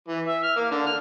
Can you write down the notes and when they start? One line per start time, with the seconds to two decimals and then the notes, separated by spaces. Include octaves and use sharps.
0.08 E3
0.27 E5
0.43 F6
0.56 A#3
0.71 D3
0.86 F6